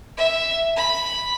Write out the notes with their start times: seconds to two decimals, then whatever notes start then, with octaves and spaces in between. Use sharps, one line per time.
0.17 E5
0.77 B5